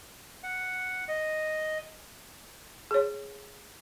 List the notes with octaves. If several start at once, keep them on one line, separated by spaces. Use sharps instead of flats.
F#5
D#5
G#4 C#5